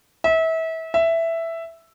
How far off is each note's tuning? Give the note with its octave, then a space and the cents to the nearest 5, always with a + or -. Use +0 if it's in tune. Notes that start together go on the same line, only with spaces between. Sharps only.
E5 -30
E5 +5